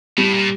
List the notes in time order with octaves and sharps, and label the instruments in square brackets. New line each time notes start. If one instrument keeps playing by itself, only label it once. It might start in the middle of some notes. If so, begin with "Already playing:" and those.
[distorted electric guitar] A2 [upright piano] G3
[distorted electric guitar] A#2